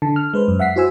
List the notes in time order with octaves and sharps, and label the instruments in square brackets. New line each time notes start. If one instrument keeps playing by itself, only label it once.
[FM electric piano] D3 A5
F6
G#3 B4 C5
F#2
E5 F#5 B6 C7
E4 F#4 C5 G#5 E6